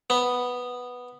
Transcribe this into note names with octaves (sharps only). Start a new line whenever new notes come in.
B3